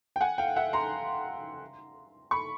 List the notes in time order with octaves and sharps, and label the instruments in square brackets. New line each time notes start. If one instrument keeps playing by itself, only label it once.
[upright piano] G5
F#5 G#5
F5 G5
E5 F#5
A#5 C6
B5 C#6